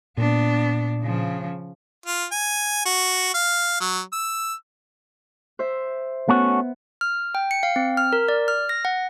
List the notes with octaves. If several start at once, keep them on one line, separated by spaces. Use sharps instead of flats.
A#2 B3 D4
C#3 F3
F4
G#5
F#4
F5
F#3
E6
C5 E5
A3 B3 C#4 F#4
F6
G5
C#7
F5
C4
F6
A#4
D5
F6
A#6
F#5